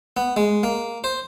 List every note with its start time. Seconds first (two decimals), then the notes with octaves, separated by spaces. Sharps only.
0.17 B3
0.37 G#3
0.63 A#3
1.04 C5